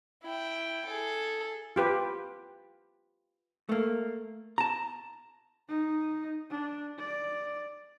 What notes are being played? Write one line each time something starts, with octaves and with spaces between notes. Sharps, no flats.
E4 G5
G#4 A4
F4 G4 B4
A3 A#3
A5 A#5
D#4
D4
D5